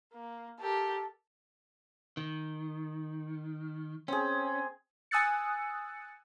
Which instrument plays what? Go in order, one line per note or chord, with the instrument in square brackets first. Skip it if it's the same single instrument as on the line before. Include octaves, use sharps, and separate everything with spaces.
[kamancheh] A#3
[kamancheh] G4 A#4 [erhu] A4
[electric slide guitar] D#3
[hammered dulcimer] C4 G#4 [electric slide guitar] C#4
[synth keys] G#5 D#6 E6 F#6 A6 C#7